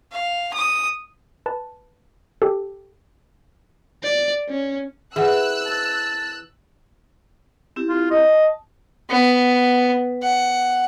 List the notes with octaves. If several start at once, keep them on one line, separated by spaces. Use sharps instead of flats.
F5
D#6
B4 A5
G4 A4
D5
C#4
E3 G#4 F#5 E6 F#6
A5
C4 E4 G4
F4
D#5
A5
B3
F#5